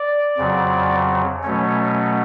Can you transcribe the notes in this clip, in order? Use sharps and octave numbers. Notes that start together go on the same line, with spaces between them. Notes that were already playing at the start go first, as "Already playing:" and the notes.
Already playing: D5
F2 C#3 F#3
B2 F#3 A3 C#4 C#5